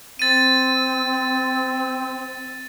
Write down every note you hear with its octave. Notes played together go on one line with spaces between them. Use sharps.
C4 A6 D#7